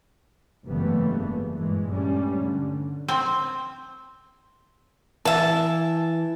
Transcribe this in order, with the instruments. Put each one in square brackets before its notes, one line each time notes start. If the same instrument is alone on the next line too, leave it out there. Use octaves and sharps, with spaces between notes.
[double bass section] F#1 G#2 E3 G3 A3 B3
G2 A#2 E3 G#3
G2 G3 A3 C#4
D3
[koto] C4
[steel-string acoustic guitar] E3 [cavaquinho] E5 A5